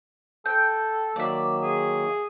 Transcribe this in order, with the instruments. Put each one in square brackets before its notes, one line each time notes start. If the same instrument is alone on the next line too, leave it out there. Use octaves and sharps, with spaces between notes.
[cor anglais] A4 [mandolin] G5
[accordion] D#3 F#3 A#3 [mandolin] D5 E5
[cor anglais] G#4